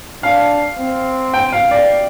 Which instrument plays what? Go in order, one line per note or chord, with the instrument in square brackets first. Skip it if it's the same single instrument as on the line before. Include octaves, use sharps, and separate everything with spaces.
[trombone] D4 [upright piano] F5
[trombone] C4
[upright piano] G5
F5
D5